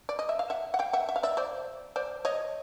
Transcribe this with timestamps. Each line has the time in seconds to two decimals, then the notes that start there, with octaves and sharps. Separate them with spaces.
0.09 D5
0.19 D#5
0.29 E5
0.39 F5
0.50 E5 F#5
0.74 F#5
0.79 F5 G5
0.93 E5 F#5
1.09 E5
1.16 F5
1.23 D5 E5
1.37 C5 D5
1.96 C5 D5
2.25 C#5 D#5